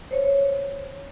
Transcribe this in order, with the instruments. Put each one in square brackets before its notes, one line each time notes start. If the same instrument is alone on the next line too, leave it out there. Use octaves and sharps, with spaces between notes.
[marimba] C5 C#5